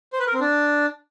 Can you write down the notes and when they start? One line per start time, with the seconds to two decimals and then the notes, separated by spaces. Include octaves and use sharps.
0.13 C5
0.20 B4
0.27 A#4
0.34 C4
0.40 D4